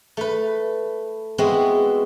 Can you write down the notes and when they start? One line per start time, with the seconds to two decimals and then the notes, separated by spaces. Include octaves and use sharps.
0.17 A3 B4
1.38 G#3 B3 C4 E4 F#4